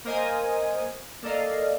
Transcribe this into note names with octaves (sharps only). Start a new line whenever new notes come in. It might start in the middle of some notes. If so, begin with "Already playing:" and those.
A#3 A#4 C5 D#5 G#5 D#6
A#3 A4 D5 D#5 F5